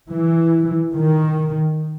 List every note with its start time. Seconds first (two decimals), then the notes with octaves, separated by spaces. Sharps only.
0.11 E3
0.94 D#3